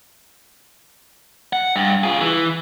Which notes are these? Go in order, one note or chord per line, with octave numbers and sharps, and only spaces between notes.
F#5
G2
F4 G#4
E3